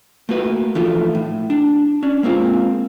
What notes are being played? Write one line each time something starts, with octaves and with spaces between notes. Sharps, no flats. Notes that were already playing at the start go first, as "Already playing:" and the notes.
A3 A#3 F#4 B4
E3 F3 A3 D#4 F4
A2
D4
C#4 D4
G#3 A#3 C4 F4